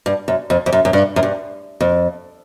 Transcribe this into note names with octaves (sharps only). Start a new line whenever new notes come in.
G2
F#2
F2
F2
F#2
F#2
G2
F#2
G2
F2